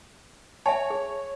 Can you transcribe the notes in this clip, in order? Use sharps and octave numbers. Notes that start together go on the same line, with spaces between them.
C#5 E5 G#5 A5
G#4